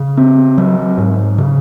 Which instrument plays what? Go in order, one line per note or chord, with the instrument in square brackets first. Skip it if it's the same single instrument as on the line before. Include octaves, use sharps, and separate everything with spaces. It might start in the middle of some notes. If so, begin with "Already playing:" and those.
Already playing: [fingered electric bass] C#3
C4
F#3
G#2
C#3